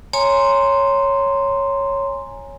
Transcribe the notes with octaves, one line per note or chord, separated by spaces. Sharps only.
C#5 G#5 A#5 C6